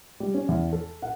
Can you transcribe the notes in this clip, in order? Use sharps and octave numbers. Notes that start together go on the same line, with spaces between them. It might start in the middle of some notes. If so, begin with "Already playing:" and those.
G3
C#4
E2
A4
F#5